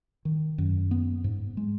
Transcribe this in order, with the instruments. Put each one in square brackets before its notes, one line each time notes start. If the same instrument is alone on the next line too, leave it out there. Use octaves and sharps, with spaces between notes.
[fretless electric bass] D#3
F#2
B3
G#2
G#3